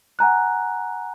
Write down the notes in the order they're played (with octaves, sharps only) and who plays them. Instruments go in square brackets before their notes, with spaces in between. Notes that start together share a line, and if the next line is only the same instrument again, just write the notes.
[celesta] F#5 G#5 A#5 F#6